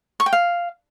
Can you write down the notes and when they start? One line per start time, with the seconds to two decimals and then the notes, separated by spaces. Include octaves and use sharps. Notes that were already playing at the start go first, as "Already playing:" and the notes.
0.20 C#6
0.26 G5
0.33 F5